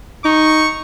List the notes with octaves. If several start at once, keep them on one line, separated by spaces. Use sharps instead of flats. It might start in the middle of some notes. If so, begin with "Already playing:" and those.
D#4 C#6